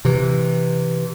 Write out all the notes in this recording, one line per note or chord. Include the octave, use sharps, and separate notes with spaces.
C3 E3